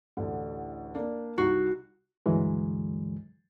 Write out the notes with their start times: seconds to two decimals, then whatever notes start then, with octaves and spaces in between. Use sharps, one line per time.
0.17 A1 D2 D3
0.95 A#3 D4
1.38 C2 D#4 F#4 C7
2.26 C#2 G2 D3 E3 F#3 G#3